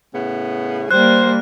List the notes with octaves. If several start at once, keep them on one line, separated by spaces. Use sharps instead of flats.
A2 C#3 B3
G3 A#3 C5 F#6